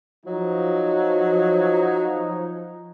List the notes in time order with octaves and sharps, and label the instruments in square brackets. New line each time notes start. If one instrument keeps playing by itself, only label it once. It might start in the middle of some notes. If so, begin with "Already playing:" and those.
[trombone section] F3 D#4 [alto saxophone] F#3